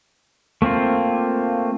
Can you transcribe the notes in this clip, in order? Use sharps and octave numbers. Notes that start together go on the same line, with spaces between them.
A3 A#3 C4 F4